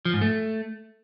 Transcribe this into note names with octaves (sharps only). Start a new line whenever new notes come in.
F3
G#2
A3